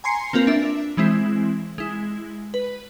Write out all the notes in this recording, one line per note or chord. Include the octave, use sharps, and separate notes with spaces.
G#5 A#5 C6 C7 C#7
A#3 C4 F4 A#4 B4
D4 E5
E3 G#3 C4 E4
G#3 E4
B4